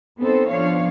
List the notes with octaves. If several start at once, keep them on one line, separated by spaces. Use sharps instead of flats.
B3 C4 D#4 A4 C5
F3 B3 D4 C#5 F5